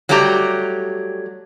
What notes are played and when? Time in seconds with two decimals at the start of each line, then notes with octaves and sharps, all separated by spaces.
0.09 F#3 G3 A3 G4 A#5